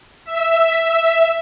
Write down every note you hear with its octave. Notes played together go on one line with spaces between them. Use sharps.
E5